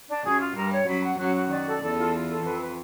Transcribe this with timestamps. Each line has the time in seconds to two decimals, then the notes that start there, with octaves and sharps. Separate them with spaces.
0.09 D4
0.24 F#2 F#3 G#4
0.40 F4
0.55 G2 G3 A#4
0.72 C#5
0.87 F#2 F#3 B5
1.04 F#5
1.18 F#2 F#3 F#4
1.35 F#4
1.50 D#3 D5
1.67 A4
1.81 E2 E3 A4
1.97 F4
2.14 F4
2.29 A4
2.44 F2 F3 B4
2.60 B4